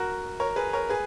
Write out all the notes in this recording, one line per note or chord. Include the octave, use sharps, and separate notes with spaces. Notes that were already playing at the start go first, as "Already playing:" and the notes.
Already playing: F#4 A#4
A#4 C#5
G#4 B4
A#4 C#5
G#4 B4